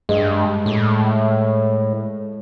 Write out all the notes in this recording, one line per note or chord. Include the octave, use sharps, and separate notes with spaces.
G2 G#3
A2